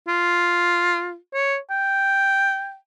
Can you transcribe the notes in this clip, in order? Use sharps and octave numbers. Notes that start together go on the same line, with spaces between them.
F4
C#5
G5